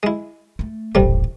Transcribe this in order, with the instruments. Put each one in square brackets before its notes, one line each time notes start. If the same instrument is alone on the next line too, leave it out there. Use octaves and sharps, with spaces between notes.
[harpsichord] G#3 E4
[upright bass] A3
[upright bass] D#1 A1 [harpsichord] C3 G3 A3